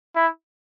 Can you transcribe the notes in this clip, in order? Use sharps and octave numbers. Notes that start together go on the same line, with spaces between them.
E4